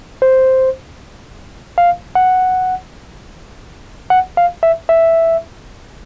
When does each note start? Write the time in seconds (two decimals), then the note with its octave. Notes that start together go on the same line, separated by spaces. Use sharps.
0.22 C5
1.78 F5
2.15 F#5
4.10 F#5
4.37 F5
4.63 E5
4.89 E5